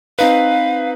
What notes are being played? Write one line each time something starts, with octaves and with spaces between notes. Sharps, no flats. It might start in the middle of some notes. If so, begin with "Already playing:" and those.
C4 D#4 B4 F5